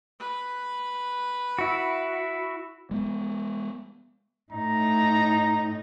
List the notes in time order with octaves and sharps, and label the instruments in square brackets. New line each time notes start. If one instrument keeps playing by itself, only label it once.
[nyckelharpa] B4
[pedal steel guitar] E4 F#4
[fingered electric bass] G#3 B3
[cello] A2 D#4 [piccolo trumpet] A#5